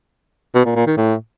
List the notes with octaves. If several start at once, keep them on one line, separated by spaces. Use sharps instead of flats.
B2
A#2
A#2
D#3
A2